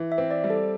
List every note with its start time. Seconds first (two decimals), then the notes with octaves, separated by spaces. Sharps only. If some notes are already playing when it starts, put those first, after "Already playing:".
Already playing: E3
0.12 E5
0.18 C4
0.31 D5
0.44 G3
0.50 A4